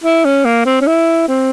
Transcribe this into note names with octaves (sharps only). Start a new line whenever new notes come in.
E4
C#4
A#3
C4
C#4
E4
C4